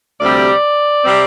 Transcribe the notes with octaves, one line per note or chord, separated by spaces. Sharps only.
D2 C3 G3 C4 D5
C3 G3 C4